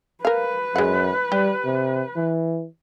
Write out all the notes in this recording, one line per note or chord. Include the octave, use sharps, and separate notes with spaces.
A#4 B4 F5
F#2 G#3 F#5
G3 G4
C3
E3